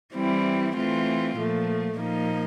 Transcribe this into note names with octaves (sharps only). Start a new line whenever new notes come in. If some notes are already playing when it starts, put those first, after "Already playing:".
E3 G3 C4 E4
E3 A3 C4 F4
A#2 F3 A3
A#2 F3 A#3 D#4